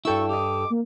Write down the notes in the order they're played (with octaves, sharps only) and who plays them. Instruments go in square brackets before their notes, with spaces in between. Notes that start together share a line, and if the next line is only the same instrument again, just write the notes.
[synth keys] G2 A4 E6 [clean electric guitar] E4 F#4 G5 [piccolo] C#6
[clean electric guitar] G4 D#5 [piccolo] D6
[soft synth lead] A#3